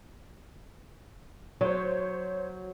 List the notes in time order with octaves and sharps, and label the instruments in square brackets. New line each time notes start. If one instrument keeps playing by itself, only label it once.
[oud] F#3 [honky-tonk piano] C5 C#5